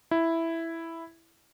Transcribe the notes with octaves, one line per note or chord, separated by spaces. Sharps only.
E4